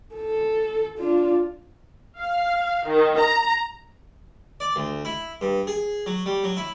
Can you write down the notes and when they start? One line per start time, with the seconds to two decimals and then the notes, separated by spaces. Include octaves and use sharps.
0.15 A4
0.98 D4 F4
2.20 F5
2.87 D#3
3.19 A#5
4.60 D5
4.76 D2
5.05 E4
5.41 G2
5.67 G#4
6.06 F#3
6.26 G3
6.44 F#3
6.57 E4